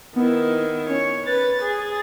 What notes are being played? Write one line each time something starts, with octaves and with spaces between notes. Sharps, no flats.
D#3 B3 E4
C#4 C#5
B4 A6
G#4